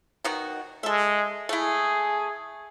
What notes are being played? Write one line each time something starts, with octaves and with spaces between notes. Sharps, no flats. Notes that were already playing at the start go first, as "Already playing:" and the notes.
B2 D#3 F#4
G#3 A4 E5
A3 E4 G#4